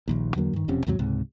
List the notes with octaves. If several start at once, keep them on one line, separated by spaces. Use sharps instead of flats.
D#1 A#1 D#2
E2 D3 F#3 A#3
G2 D#3
E1 F2 C3 C#4
D#2 G#2 C3 F#3
C#2 G#2 C3